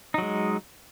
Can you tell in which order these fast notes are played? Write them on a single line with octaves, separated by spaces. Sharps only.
D#4 F#3 G#3